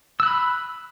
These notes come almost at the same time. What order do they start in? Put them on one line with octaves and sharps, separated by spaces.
E6 F#6 B5